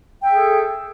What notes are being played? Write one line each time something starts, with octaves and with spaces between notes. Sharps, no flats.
G#4 A4 E5 G5